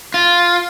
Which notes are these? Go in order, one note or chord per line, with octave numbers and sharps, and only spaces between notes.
F4